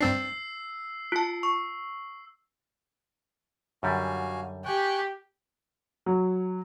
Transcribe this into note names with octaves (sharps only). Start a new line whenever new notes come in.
G2 C4 D4 E6 C7
F4 A5
C#6
F#2 D3 G3 F#4 F5 G#5
G4 G#5 C#6 F#6
F#3